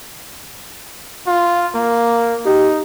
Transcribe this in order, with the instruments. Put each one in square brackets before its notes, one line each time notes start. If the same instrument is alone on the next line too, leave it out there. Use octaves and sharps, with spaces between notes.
[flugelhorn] F4
A#3
[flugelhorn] D#4 [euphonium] G4